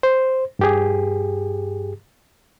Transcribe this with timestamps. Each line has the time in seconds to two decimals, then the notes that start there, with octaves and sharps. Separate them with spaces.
0.03 C5
0.59 G2 G4 G#4